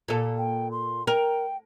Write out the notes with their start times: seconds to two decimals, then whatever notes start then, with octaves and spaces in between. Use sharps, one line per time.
0.08 A#2 A4
0.38 G5
0.71 C6
1.07 A#4 G5